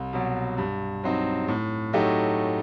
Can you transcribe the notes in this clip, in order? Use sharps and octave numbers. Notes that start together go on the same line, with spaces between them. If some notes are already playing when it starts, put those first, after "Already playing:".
Already playing: C2
B2 F#3
G2
F#3 C4 D#4
A2
F#3 A3 D#4 G4